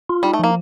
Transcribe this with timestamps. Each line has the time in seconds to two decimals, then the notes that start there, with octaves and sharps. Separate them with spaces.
0.09 F4
0.23 G3 D#4
0.33 A3
0.39 F3 A#3